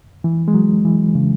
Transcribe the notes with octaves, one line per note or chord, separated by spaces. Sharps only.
E3
G#3
F#3
E3
C#3